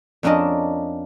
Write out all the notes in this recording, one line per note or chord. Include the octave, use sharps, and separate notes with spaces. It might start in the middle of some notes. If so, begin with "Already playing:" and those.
F2 C#4 D4 A#4 D#5 A5